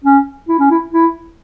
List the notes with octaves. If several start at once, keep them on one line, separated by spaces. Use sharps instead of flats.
C#4
E4
C#4
E4
E4